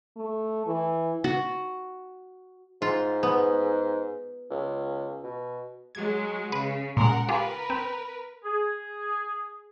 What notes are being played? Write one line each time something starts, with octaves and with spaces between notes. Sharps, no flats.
A3
E3
F#4
G#2 F4
B3
C#2
B2
F#3 G#3 G#6
C#3 B4
A#2 G#3 A#4 F#5
F4 G4 G#4 A#4 B4
C4
G#4